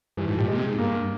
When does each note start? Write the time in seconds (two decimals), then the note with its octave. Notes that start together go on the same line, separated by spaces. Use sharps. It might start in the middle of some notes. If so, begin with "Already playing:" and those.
0.17 G2 E3
0.28 G#2 F3
0.38 A#2 G3
0.48 A#2 G#3
0.58 C3
0.68 G#2
0.78 G2 A#3